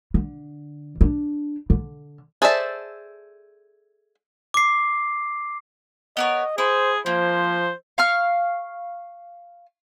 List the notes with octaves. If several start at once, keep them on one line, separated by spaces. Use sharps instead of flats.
D3
D4
D3
G#4 A4 C5 D5 E5
D6 C7
B3 A#4 C#5 D#5
E4 G#4 C5
F3 A#3 C5
F5 C#6 F6